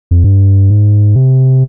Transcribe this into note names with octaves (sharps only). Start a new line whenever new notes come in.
F2
G2
G#2
C3